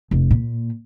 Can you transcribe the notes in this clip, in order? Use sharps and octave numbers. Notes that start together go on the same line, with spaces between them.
F1
A#2